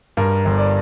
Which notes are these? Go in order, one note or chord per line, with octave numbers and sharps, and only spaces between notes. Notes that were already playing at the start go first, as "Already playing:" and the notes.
G2 A#4
G1
D5